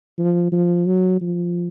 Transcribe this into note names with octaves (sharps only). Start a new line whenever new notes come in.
F3
F3
F#3
F3